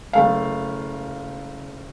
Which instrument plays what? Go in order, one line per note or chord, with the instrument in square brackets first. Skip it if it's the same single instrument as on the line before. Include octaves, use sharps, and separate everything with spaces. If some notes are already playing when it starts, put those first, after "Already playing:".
[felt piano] F#1 A3 F5